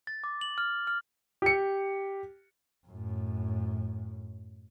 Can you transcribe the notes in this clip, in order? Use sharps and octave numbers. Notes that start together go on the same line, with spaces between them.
A6
D6
F#7
F6
F6
G4 C#7
F#2 A2